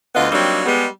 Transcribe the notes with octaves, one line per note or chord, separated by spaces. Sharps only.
D2 D3 B3 F4 D#5 F5
F#3 G3 A#3 C4 D4 D#4
G3 G#3 B3